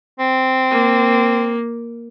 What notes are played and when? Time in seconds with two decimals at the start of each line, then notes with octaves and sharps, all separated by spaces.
0.19 C4
0.71 A#3